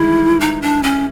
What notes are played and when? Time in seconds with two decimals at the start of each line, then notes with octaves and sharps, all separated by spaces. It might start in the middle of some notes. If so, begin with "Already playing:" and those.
Already playing: D#3 E3 G3 G#3 E4
0.40 D#4
0.62 D4
0.83 C#4